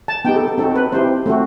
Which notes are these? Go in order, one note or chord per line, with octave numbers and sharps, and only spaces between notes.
A5
B3 D#4 G4 G5
A4
A4
C4 D#4 F#4 A4
B4
C4 E4 G4 C5
A3 C4 F#4